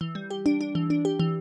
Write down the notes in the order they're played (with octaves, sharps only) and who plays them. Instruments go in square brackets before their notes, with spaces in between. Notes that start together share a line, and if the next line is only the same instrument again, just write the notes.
[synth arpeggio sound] E3
G3
G4
D4
D4
E3
D4
G4
E3